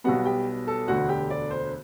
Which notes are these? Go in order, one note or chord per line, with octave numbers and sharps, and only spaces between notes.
B1 B2 G3 B3 F#4 F#5
G4 G5
A4 A5
E1 D2 D3 F#4 F#5
G4 G5
D5
C5